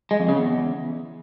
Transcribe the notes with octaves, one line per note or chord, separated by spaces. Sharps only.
G#3
F2
C#3
E2